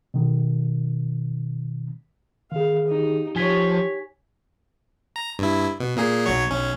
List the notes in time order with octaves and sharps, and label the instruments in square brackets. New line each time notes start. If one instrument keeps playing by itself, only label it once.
[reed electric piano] B2 D#3
[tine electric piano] D#3 G#4 [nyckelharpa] F5
[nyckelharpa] D#4 G4
[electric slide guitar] F3 [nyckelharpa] G4 C#5 [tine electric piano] G#5 G#6 B6
[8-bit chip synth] A#5
G2 E4
B2
A#2 A#3 G#4
B1 F#3 C#5
B1 C#4